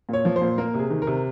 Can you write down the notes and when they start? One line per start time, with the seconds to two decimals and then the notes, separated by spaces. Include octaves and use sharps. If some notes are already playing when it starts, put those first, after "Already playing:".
0.09 A#2 C#5
0.25 F3
0.36 C5
0.41 A#2
0.58 A#3 A#4
0.74 C3 G#4
0.91 D#3
1.02 A#4
1.07 C3